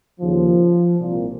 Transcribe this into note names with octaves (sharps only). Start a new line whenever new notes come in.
D#2 C#3 F3
C2 A#2